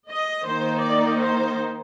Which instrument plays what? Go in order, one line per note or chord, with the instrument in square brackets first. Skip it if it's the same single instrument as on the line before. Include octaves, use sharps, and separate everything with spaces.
[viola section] D#5
D#3 A#3 D#4 C5
D5
C5